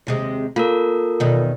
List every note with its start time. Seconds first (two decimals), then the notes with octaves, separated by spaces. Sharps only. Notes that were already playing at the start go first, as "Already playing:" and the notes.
0.07 D#2 C3 G#3
0.56 A#3 F4 A4 A#4
1.20 E2 B2 D#3